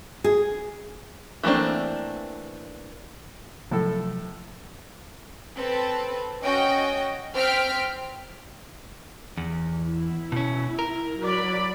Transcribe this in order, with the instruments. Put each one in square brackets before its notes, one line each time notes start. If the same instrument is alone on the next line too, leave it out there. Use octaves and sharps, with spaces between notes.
[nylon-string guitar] G#4
[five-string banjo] E3 A3 A#3 C4 D4
[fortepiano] A2 A4 [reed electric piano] C3 F#3 [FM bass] F3
[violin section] C4 A4 B4
C#4 F#4 D#5 G5
C4 G5 F6 B6 D7
[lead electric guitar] E2
[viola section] E4
[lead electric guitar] B2 C#4
A#4
[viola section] F#3 D5 B5